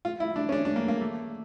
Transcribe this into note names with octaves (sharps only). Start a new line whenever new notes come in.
F4
E4
D4
C#4
D4
D4
A#3
A#3
A3